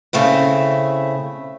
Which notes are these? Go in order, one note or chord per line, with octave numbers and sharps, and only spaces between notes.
C#3 A3 C4 E4